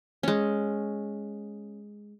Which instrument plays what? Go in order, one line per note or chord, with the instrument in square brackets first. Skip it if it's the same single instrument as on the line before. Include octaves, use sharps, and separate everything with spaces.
[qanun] G#3 C#4